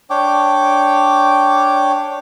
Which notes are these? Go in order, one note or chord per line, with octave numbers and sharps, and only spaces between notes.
D4 C#5 G5 D6